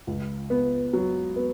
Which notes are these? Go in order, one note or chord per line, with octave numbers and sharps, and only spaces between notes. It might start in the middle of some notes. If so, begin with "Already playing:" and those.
C#2
B3
F#3
B3